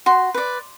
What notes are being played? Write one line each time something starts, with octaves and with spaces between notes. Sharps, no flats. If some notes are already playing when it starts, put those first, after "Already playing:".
F#4 C6
B4 D5